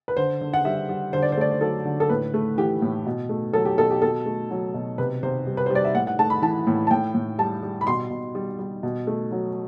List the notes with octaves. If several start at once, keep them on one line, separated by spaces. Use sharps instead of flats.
B4
D3 C5
D3
F#5
G3 E5
G3
D3 C5
D5
C5
A3 D5
C5
F#3 A4
D3
A4
A2 B4
A3
E3 G4
A2
B2
A3
F#3 A4
G4
B2 A4
G4
B2 A4
A3
F#3
B2
C3 B4
C3 C5
G3
B4
G3 C5
D5
E5
A2 F#5
F#5
A3 A5
B5
E3 A5
A2
A5
A2 G5
A2
G3 A5
G3
B5
B2 C6
B2
G3
G3
B2
A3
F#3